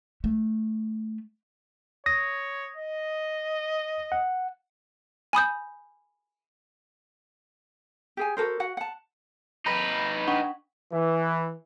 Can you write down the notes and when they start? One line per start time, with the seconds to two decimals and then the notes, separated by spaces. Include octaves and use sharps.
0.24 A3
2.06 C#5 D#6 A#6
2.76 D#5
4.12 F#5
5.33 G#5 B5 D#6 G6
8.17 G4 G#4 G#5
8.37 F#4 A4 A#4 C5
8.60 F#4 F#5
8.77 F#5 A5
9.66 D#4 B4 A#5 B5 A#6
10.28 D4 F#5 C#6
10.93 E3